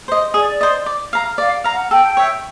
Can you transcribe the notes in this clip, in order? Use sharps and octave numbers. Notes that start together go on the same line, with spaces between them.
C5 D#5
G#4 D5
C5 D#5
D5
F5 A#5
D5 F5
F5 A#5
F#5
A4 G5
C#5 E5